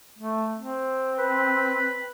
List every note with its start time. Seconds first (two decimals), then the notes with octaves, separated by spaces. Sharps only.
0.19 A3
0.57 C4
1.18 B4